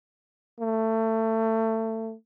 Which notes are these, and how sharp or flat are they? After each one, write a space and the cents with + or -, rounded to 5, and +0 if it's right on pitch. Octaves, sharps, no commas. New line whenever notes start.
A3 +25